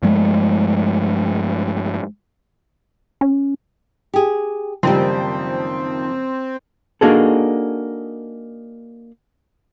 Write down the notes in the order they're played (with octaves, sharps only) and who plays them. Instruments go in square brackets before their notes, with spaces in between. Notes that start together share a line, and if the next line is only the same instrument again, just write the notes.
[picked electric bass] G2 F3 G#3 A3
[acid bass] C#4
[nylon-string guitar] G4 G#4
[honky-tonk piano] F#1 F3 [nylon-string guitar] D#3 G3 [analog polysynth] C4
[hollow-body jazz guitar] A#3 D4 D#4 F#4 G#4 A4